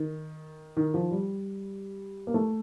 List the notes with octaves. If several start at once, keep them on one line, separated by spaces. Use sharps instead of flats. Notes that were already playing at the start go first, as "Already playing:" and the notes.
Already playing: D#3
D#3
F3
G3
A#3
A3